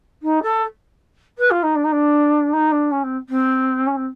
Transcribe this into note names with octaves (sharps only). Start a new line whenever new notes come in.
D#4
A4
B4
F4
D#4
D4
D#4
D4
D#4
D4
C#4
C4
C4
C#4
C4